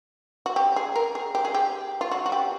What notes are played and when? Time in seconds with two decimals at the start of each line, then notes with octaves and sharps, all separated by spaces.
0.46 F#4
0.56 G4
0.76 G#4
0.96 A#4
1.15 G#4
1.35 G4
1.45 G#4
1.54 G4
2.01 F4
2.11 F#4
2.26 F#4
2.32 G4